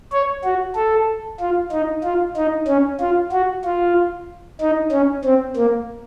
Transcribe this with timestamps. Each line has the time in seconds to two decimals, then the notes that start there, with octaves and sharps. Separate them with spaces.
0.12 C#5
0.45 F#4
0.76 A4
1.40 F4
1.72 D#4
2.04 F4
2.37 D#4
2.68 C#4
3.01 F4
3.32 F#4
3.65 F4
4.61 D#4
4.92 C#4
5.24 C4
5.56 A#3